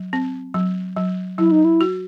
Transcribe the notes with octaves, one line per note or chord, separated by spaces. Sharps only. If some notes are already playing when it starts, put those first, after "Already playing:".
Already playing: F#3
C4
F#3
F#3
F#3 E4
D#4
E4
F#4